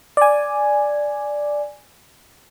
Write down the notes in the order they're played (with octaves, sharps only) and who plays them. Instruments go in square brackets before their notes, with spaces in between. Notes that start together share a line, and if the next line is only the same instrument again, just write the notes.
[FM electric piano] D5 G#5